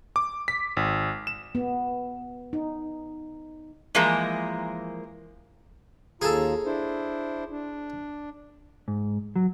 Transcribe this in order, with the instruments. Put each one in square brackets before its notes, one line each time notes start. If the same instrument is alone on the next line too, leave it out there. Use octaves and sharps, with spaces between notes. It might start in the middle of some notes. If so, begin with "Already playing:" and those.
[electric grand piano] D6
B6
G#1
E7
[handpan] B3
D#4
[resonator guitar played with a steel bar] E3 F3 G#3 A#3 A#4
[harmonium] D#2 F4 A#5 [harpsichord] G#4 A4
[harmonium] D4 E4 C5
D4
[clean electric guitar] G#2
F#3